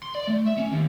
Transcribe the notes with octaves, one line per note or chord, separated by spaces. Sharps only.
C6
D5
A3
E5
C#4
D#2